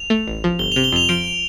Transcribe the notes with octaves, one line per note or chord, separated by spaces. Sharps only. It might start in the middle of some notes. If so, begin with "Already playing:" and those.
Already playing: F7
A3
A1
F3
G1 G7
C3 F7
G7
F2 F7
F3 D7